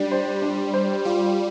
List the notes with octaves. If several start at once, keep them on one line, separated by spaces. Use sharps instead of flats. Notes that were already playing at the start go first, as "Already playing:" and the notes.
Already playing: G3 D4
C5
D4
C5
G3 F4